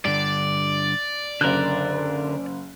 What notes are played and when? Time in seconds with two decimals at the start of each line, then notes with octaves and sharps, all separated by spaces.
0.05 G2 D3 D5
1.41 F#1 D3 A#4 F#6